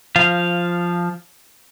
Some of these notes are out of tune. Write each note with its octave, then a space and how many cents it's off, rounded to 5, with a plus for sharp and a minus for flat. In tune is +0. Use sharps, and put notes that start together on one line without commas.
F3 +0 F5 -10